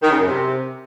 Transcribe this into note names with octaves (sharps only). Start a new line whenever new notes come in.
D#3
C#3
F#2
C3